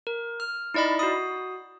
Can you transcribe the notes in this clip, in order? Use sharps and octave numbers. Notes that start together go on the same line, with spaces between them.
A#4
F6
D#4 E4 D5 D#5 B5
F#4 D#6